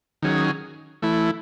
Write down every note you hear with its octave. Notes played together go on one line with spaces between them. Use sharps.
D#3 F#3 C#4 G#4
E3 A3 E4